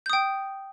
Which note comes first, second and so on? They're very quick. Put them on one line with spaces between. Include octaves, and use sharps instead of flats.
G6 D#6 G5